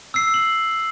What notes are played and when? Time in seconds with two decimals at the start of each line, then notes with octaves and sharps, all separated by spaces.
0.14 E6 C7
0.34 F#7